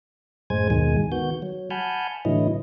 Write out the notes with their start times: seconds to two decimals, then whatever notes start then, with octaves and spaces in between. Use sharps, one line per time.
0.50 F#2 A2 G#3 C5 G#5 G#6
0.70 D#2 G#2 B2 D#3 G#3 G#5
1.12 D#3 B3 F#4 G6
1.42 F#3
1.70 F#5 G#5 A5 B5 F6 G6
2.25 A2 D3 E3 F#3 E4 D#5